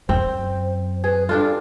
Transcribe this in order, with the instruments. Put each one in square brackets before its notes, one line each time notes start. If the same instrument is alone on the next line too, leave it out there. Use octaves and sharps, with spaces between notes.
[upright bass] F#2 [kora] C4 [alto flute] C5
[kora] G#4 [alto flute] B4
[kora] G2 D4 F4 [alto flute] A4